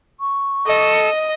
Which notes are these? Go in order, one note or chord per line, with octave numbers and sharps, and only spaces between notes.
C#6
A4 D#5